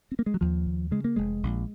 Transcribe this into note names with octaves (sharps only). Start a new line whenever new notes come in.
C4
A#3
G#3
F#3
D#2 F3
D#2
C#3 G#3
A#3
F1 G#3
A#1